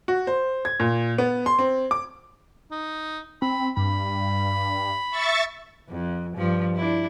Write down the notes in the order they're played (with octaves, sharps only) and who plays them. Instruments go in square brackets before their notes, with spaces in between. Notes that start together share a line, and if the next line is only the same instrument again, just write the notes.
[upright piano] F#4
C5
G#6
A#2
B3
C6
C4
D6
[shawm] D#4
[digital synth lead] C4 [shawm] B5
[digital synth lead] G2 [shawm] B5
[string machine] E5 C#6 A6
[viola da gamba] F2
G2 F3
D4 E4